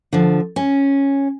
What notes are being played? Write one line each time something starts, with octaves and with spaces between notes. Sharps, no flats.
D3 F3
C#4